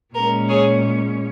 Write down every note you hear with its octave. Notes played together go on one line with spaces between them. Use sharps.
A#2 G#3 C#4 A#4
G#4 C#5